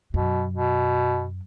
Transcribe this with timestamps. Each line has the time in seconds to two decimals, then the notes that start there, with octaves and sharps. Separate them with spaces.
0.14 F#2 B2
0.53 B2